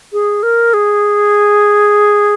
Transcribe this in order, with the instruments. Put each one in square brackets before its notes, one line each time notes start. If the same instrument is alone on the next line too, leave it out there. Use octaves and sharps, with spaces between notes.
[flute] G#4
A#4
G#4